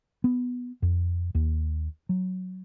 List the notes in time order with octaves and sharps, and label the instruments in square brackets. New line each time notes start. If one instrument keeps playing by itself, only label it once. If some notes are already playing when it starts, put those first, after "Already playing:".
[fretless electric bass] B3
F2
D#2
F#3